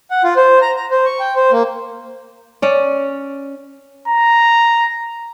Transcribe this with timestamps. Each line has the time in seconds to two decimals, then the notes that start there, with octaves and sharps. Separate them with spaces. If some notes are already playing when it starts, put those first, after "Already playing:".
0.11 F#5
0.24 F4
0.36 C5
0.62 A#5
0.77 A#5
0.91 C5
1.05 C#6
1.20 G5
1.36 C5
1.52 A#3
2.62 C#4 D5
4.08 A#5